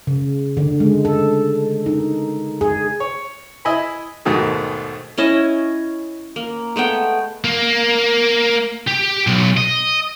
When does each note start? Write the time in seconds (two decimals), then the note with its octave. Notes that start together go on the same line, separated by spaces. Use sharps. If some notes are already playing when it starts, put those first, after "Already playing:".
0.07 C#3
0.57 D3
0.80 G#3
1.05 A4
1.86 D#4
2.61 G#4
3.00 C#5
3.65 E4 D#5 E5 G#5 B5
4.25 D#2 G#2 B2 D#3 G#3 A3
5.18 C#4 E4 D#5 E5
6.36 A#3
6.76 G#3 A3 B3 G5
7.44 A#3
8.87 G4
9.27 B1
9.57 D#5